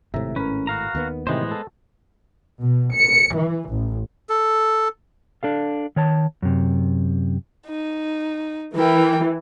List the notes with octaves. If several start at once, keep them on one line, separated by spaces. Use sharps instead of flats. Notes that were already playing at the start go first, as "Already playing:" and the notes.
G#1 A2 C3 E5 A#5
C#4 A#4 B4
F#4 F5 A#5
D#2 D#3 B3
A2 C3 D#3 E3 G#3 B3 C#4 C5
A4
B2
C#7
E3
A1
A4
D4 A4 F5
D#3 C#5 A5
F#2 C3
D#4
E3 A#4 G5